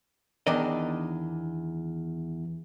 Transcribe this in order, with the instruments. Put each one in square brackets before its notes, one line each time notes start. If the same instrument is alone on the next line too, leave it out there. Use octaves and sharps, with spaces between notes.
[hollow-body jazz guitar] E2 D#3 D4 A#4 D5 D#5